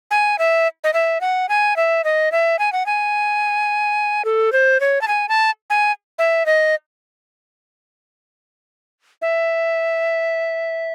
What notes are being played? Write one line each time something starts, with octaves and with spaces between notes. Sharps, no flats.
G#5
E5
D#5
E5
F#5
G#5
E5
D#5
E5
G#5
F#5
G#5
A4
C5
C#5
A5
G#5
A5
G#5
E5
D#5
E5